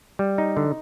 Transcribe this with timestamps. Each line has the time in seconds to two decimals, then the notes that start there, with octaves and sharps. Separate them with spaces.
0.19 G3
0.38 D#4
0.57 D3